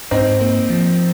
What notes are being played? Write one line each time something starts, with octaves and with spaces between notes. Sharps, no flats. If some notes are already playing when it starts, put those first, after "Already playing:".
G#2 C4 D#4
A#3
F3